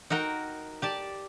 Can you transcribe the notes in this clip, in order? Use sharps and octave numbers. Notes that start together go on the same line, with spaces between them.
D#4 F#4 A#4 F#5 G5
G4 D5 A5